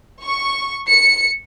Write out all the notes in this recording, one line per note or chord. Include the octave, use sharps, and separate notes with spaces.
C#6
C#7